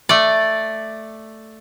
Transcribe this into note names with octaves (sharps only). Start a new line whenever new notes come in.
A3 D5